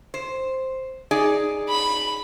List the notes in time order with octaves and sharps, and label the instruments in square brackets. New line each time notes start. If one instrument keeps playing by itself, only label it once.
[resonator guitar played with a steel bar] C5
D#4 G#4 D5
[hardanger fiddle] B5